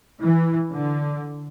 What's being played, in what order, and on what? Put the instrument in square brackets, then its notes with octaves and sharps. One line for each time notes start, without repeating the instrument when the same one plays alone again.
[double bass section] E3
D3